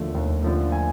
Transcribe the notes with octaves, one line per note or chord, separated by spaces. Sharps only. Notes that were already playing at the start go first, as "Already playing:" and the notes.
Already playing: D#2 D3 F3 A3
D#2
D3 F3 A3
G#5